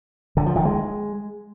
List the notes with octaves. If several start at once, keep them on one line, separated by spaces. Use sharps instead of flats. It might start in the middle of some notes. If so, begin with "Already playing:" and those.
D3
F3
D#3
G#3